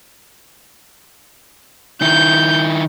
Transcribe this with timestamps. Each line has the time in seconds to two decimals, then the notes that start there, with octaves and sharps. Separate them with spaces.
2.02 D#3 E4 G6